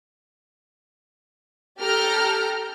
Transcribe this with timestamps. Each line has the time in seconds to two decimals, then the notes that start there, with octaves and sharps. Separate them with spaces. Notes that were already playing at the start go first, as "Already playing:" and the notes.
1.79 G4 A4 A#5 F6 G6